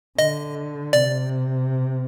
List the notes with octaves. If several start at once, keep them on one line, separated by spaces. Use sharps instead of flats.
D3 D#5
C3 D5